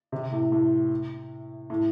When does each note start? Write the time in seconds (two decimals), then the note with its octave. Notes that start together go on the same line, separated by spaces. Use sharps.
0.12 C3
0.31 A2
0.52 A2
1.70 A2